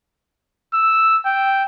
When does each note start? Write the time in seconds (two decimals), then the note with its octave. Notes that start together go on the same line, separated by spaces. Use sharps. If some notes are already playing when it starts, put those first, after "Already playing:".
0.74 E6
1.26 G5